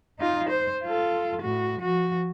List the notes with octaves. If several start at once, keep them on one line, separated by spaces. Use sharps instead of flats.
D#4 F4
C5
F4 A4
A2 F#4
F3 F#4